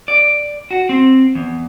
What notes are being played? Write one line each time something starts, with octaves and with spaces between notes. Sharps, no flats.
D5
F#4
C4
E2